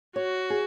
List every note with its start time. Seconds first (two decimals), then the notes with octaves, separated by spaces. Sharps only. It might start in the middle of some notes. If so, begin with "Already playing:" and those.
0.16 F#4 C#5
0.50 G#4